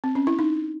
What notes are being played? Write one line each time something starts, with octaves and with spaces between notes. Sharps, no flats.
C4
C#4
E4
D#4